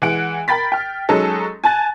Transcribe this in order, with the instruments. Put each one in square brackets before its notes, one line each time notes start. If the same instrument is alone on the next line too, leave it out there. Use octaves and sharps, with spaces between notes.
[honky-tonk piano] E3 G#3 F#5 D7
A#4 G5 B5 A6 B6
G5 F6
F#3 G#3 C#4 D#4 A4
G#5 A5 F#6 A6